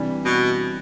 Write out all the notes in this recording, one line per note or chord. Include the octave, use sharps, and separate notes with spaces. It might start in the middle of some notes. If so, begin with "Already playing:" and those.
Already playing: C3 E3 G3 D4
B2